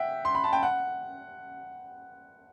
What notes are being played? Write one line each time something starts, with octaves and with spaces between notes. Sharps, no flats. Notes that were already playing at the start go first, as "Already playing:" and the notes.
Already playing: E5 F#5 G5
C6
B5
A5
G5
F#5